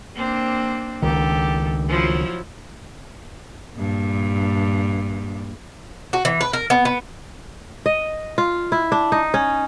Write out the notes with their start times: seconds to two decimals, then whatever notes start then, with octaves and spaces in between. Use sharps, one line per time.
0.15 A#3 C4 D4
1.02 C#2 D#3 G4 A4
1.88 F3 F#3 E4
3.74 G2 A#2
6.13 F#4
6.25 E3
6.41 B4
6.53 A#4
6.70 B3
6.85 B3
7.86 D#5
8.38 F4
8.72 E4
8.92 D4
9.12 D#4
9.34 C#4